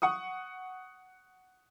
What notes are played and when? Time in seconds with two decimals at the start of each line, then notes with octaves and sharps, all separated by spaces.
0.02 F#5 C#6 D#6